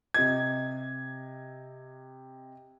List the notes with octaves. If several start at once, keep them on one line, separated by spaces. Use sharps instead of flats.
C3 D#5 G#6